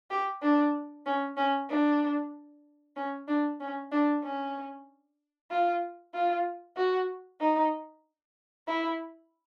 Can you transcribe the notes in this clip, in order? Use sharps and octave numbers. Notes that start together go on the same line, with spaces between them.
G4
D4
C#4
C#4
D4
C#4
D4
C#4
D4
C#4
F4
F4
F#4
D#4
E4